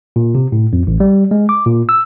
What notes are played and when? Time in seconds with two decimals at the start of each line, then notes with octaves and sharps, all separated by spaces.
0.16 A#2
0.35 C3
0.52 A2
0.73 F2
0.87 A1
1.00 G3
1.31 G#3
1.49 D6
1.66 A#2
1.89 E6